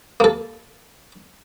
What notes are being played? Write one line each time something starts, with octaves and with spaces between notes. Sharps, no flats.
A#3 A4